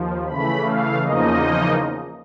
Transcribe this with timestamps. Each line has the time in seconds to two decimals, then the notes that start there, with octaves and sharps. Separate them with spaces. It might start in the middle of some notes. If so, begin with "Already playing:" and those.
Already playing: D#2 F3
0.26 C#3 E3 A3 B5
0.64 F5
1.02 E2 C#3 F3 A#3 D#4 D#5